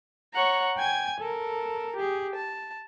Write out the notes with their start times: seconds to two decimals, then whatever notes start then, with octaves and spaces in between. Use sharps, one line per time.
0.33 C#5 F#5 A#5
0.77 G5 G#5 G#6
1.20 A4 A#4
1.97 G4 G#4
2.35 A5